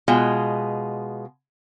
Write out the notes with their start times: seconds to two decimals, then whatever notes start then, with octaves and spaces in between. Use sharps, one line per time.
0.08 B2 G#3 F4